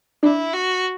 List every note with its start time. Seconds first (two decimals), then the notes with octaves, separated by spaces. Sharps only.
0.23 D4 E4
0.53 F#4